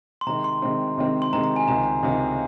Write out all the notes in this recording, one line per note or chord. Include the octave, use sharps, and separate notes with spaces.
C6
C3 D#3 G#3 C4 A#5
C6
C3 D#3 G#3 C4
C3 D#3 G#3 C4
C6
C3 D#3 G#3 C4 A#5
A#5
G#5
C#2 C3 D#3 A#5
C#2 C3 D#3